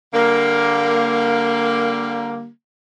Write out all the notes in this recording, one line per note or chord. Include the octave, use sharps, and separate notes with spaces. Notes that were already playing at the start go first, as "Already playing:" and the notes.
D3 G3 A#3